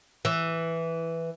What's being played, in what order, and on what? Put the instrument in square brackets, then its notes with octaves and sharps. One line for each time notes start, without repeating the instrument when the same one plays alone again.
[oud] E3